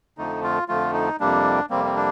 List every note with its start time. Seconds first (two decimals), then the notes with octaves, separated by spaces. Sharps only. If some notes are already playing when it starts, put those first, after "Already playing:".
0.18 F2 D3 F3 A3 D#4
0.44 F4
0.68 F2 D3 F3 A3 F4
0.94 D#4
1.20 F2 C3 G3 A#3 D4
1.70 F2 C3 G3 A#3 C4
1.85 C4
1.96 D4